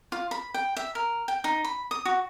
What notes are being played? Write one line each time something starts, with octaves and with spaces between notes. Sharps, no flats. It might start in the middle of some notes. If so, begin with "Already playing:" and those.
F4
B5
G5
E5
A#4
G5
D#4
B5
D#6
F#4